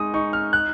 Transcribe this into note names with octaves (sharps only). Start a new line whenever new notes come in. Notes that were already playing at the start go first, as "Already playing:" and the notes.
Already playing: G#3 D#4 D#6
D#4 C#6
F6
F#6